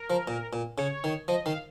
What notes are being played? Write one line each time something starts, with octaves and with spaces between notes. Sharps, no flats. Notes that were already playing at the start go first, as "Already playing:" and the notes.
Already playing: A#4
F3
A#2
A#2
C#3 C#5
D#3
F3 D#5
D#3 F5